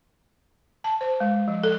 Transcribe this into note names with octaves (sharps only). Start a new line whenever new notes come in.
A5
C5
G#3
F3
A4